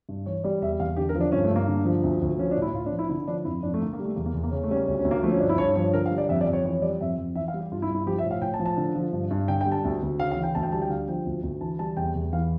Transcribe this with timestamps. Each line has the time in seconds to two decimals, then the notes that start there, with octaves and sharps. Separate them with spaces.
0.09 G2
0.26 E3 C#5
0.44 G3 D5
0.62 E2 E5
0.80 E2 F5
0.96 D3 G4
1.09 A#4
1.15 F3
1.21 D4
1.32 G2 C#4
1.44 A3
1.51 G2
1.56 A#3
1.68 D3
1.85 F3
2.04 D2
2.22 D2
2.38 F3 C#4
2.51 D4
2.57 A2 E4
2.74 A2 F4
2.86 D4
2.92 F3
2.99 E4
3.09 D3 E4
3.28 F3 D4
3.45 F2 E4
3.63 F2 D4
3.74 A3
3.81 D3 A#3
3.93 A#3
3.99 G3
4.04 A3
4.16 E2 A#3
4.26 A#3
4.34 E2
4.43 A#3
4.51 C#3 C#4
4.63 A3
4.69 G3 C#4
4.76 A#3
4.87 D2 C#4
4.99 C#4
5.05 D2
5.11 A#3
5.23 F3 A3
5.32 C#4
5.40 G2 D4
5.49 E4
5.58 G2 C#5
5.76 F3 C#5
5.94 D3 A#4
6.06 F5
6.11 G3
6.18 D5
6.29 F2 E5
6.41 D5
6.47 F2
6.53 C#5
6.64 E3 C#5
6.82 G3 D5
7.01 F2 E5
7.18 F2
7.35 E3 E5
7.48 F5
7.54 G3
7.60 G4
7.71 G2 F4
7.82 E4
7.89 G2
7.95 E4
8.06 F3 G4
8.18 E5
8.25 A2
8.31 F5
8.42 A2 G5
8.54 A5
8.59 F3
8.66 A5
8.77 D3
8.95 F3
9.13 G2
9.31 G2
9.48 D3 G5
9.61 G5
9.66 G3
9.72 A5
9.84 D2
10.02 D2
10.19 C#3 F5
10.31 F5
10.36 E3
10.43 G5
10.55 D2 A5
10.63 G5
10.72 G3 A5
10.82 G5
10.90 D3 F5
11.08 F3 G5
11.26 D2
11.43 D2
11.61 E3 A5
11.79 G3 A5
11.97 E2 G5
12.15 E2
12.33 E3 F5